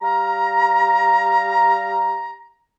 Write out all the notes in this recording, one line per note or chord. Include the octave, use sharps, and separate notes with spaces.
G3 F5 A#5